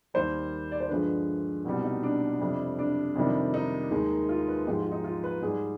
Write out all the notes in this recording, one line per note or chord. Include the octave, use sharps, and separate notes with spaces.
D#2 D#3 G3 C5
D5
C5
G2 D3 F3 G#3 B4
C2 B2 G3 G4
D#4
D4
F2 C3 G3
D4
F2 C3 D#3 G3
D#4
D#2 D#3 G#3
F4
B4
G#2 F3 G#3 G4
F4
D#4
F4
B4
G#2 G3 G#4